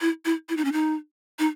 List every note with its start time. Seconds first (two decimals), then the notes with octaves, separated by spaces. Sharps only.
0.01 E4
0.25 E4
0.49 E4
0.57 D#4
0.65 C#4
0.72 D#4
1.39 D#4